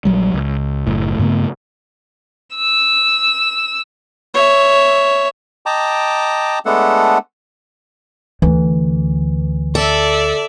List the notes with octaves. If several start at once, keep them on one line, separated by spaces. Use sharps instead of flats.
A#1 F#3 G3
C#2
F#1 A2
G2 C#3 A3 B3
E6
C#5 E5
D#5 G5 A5 A#5 D6
G#3 A3 B3 D4 A4 F#5
D2 E3
A4 D5 E5